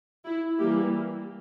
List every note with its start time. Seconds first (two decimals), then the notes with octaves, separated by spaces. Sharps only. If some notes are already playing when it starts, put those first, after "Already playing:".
0.25 E4
0.59 E3 G3 A#3 G4